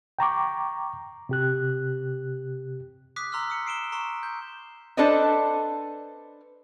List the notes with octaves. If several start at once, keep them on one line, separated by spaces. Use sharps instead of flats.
G5 A#5 C#6 D6
C3 G4 F#6
D6 D#6 F#6 B6
A#5 C6 E6 F6
D#6 C#7
C7 D7 E7 G7
A#5 C6 C#6 E7 G7
G6
D4 A4 B4 C5 D5 D#5